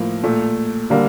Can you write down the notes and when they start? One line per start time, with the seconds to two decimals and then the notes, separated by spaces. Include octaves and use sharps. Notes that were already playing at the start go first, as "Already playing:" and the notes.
Already playing: A2 F3 A#3
0.24 A#2 A3
0.90 D3 G3 A#3